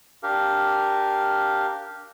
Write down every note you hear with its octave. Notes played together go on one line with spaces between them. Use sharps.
D4 G4 A#4 F5